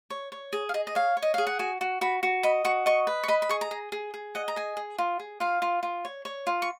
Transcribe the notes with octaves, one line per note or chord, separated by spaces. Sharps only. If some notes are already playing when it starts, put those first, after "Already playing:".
C#5
C#5
G#4
F5
G#4 D#5
D#5
C#5 F5
C#5
D#5
G#4 F5
F#5
F#4 G#5
F#4
F#4 B5
F#4
D#5 B5
F#4 C#6
D#5 C#6
B4
C#6
D#5 B5
B5
G#4 C#6
A#5
G#4
G#4
G#4
D#5 F#5
A#5
G#4 G#5
G#4
F4
G#4
F4 F5
F4
F4
C#5
C#5
F4
C#6